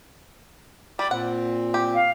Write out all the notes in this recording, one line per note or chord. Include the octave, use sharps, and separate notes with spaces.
G3 D5 B5 D6
A#2 C4 F#5
G4
F5